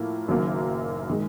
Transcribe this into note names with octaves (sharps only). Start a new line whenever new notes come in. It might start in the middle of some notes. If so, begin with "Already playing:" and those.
Already playing: A2 F3 A#3
F#1 F#2 D#3 F#3 A#3
D#3 G#3